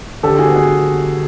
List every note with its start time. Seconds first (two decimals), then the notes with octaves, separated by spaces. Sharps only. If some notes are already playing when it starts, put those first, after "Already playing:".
0.23 D3 G4 A4
0.39 F#4 G#4
0.47 B3
0.55 F#4 G#4